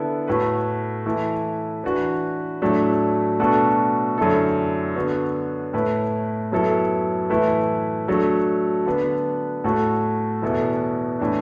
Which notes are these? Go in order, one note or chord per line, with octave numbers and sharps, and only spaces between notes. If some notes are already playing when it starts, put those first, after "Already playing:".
Already playing: D3 B3 E4 A4
A2 A3 F#4 B4
E3 A3 E4 B4
E3 D4 F#4 B4
A2 F#3 A3 D4
B2 A3 D4 F#4 A4
F#2 D3 A3 E4 A4
D3 B3 F#4
A2 A3 E4 B4
F#2 F#3 B3 E4 A4
A2 E3 A3 E4 B4
F#3 A3 D4 A4
D3 B3 D4 B4
A2 A3 F#4 A4
E2 B2 B3 E4 A4
A2 E3 D4